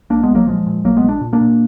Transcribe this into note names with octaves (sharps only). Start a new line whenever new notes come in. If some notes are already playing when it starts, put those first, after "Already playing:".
B1 A#3 D4
G#3 B3
B1
F#3 A#3
A#2 F3 G#3
A#2
A#1 F#3 A#3
G#3 B3
A#1
D4
A#2
A#3 D4
A#2